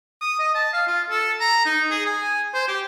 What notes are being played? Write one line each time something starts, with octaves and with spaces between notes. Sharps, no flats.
D#6
D#5
A5
F5
F4
A4
A#5
D#4
G#4
G#5
C5
G4